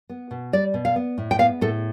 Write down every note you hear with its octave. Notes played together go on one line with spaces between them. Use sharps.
B3
B2
G3 D5
B2
F5
B3
A2
G5
B3 F5
A2 A4